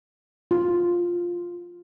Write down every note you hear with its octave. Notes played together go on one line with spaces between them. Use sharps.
F4